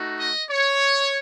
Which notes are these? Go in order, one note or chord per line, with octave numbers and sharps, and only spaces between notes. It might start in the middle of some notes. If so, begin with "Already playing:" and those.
Already playing: A3 D#4 F#4
D#5
C#5